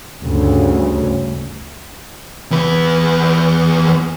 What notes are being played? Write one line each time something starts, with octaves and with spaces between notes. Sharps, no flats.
D2 G2 C#3
E2 B4